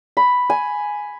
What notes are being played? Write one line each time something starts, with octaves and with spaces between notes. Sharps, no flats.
B5
G#5